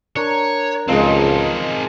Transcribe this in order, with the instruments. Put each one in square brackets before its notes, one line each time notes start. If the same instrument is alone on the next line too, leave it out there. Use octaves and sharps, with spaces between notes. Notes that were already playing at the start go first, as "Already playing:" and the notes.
[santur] D4 A#4 [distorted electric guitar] C#5
[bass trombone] C#2 [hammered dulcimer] F3 G#3 [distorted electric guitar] C4 D#4 [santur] D#5